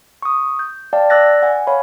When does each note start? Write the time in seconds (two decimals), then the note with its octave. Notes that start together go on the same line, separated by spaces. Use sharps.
0.22 C#6 D#6
0.59 G6
0.93 D5 F5 G5 A5
1.10 D5 D6 E6 F#6 A6 A#6
1.42 F#5 G#5
1.67 C#5 F5 B5